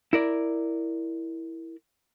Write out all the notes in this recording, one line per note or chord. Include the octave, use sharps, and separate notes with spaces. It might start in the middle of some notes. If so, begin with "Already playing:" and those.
E4 A#4 D5